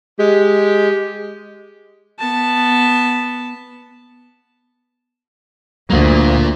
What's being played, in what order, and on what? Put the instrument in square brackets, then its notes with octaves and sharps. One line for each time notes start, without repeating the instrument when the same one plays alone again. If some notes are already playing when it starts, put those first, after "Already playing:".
[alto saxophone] G#3 [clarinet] G4
[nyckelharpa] B3 A5
[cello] D2 [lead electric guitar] A#3 F4